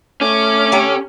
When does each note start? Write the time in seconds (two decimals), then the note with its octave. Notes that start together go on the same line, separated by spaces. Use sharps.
0.21 A3 C#4 D6
0.72 D3 G4 A#5